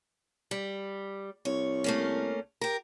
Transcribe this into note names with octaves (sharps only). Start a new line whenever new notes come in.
G3
C2 C#5
A3 A#3 C#4
G4 A#4